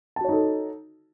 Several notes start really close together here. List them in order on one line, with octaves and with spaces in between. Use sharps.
A5 F#4 C#5 D#4 A4